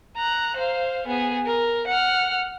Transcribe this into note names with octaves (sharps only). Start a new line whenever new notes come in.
A#5 F#6
C5 F5
B3 G#4
A#4
F#5 F6